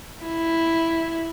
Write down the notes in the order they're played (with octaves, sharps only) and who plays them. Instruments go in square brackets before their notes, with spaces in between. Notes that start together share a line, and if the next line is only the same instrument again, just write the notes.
[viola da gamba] E4